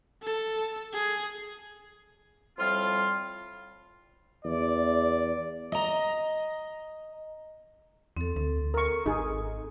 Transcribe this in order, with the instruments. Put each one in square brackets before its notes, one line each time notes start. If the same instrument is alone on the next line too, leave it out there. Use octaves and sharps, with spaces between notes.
[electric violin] A4
G#4
[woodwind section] A2 F3 G3 C4 F4
[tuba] E2 [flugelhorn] D5
[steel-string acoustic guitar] D#5 A#5
[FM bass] E2 [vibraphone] C4 A4
[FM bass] D2
[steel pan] A#4 C#6
[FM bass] G#1 [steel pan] D#4 G#4